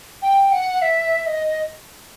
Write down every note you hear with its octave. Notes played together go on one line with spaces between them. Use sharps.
G5
F#5
E5
D#5